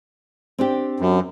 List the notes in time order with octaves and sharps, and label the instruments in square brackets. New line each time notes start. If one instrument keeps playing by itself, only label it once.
[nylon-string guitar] C4 D4 G4
[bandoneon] F#2